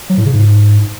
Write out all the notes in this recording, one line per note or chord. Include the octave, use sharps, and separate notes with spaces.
F#3
A2
C#3
G#2